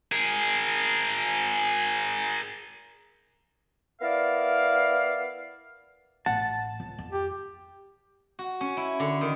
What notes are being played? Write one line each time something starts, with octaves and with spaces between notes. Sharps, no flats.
G#4 A#4
B3 E4 A#4 D5 F5
A1 F#5 A5
C#2
F2
G4
F#4
C#4
E4
D3
D#3